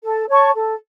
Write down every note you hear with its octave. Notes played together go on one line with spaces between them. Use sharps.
A4
C#5 A5 C#6
A4